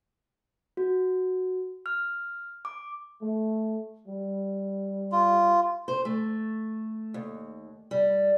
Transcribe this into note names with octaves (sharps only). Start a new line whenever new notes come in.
F#4
F6
D6
A3
G3
F4
C5
A3
D#2
G3